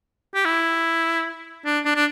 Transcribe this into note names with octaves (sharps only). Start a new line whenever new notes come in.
G4
E4
D4
D4
D4